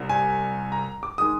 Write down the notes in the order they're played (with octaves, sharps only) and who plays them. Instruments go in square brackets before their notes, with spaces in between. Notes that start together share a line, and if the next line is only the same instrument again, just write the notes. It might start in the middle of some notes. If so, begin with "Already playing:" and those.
Already playing: [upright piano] C2 C3 G3
G#5
A#5
D6
D#3 G#3 D#6